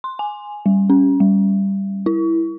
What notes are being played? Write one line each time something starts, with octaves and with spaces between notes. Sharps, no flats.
C6
G#5
G3
C#4
G3
E4